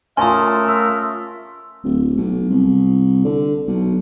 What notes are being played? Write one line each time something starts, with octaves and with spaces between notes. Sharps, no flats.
A3 C#4 F4 A#4 G#5 A5 C6 D#6
E5
D1
B1
C2
D3
B1